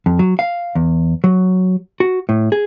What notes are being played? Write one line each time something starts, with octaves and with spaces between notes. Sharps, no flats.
F2
F#3
F5
E2
F#3
F#4
A2
G#4